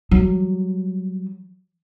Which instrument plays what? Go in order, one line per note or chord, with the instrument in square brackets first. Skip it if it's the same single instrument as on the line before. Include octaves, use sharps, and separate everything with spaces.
[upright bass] F#3 G3